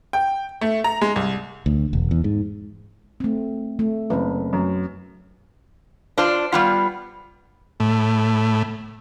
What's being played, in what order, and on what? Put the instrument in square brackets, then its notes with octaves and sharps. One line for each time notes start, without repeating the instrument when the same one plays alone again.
[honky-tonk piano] G5
A3
A#5
G#3
C2
[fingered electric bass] D2
E1
E2
G#2
[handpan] A3 C4
A3
[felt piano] F#1 [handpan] C4 B4
[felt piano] F#2
[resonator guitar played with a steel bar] D4 F4 C5 D5
G3 B3 F4
[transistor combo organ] A2